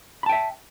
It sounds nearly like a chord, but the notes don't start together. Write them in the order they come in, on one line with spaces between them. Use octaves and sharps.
B5 A5 G5 E5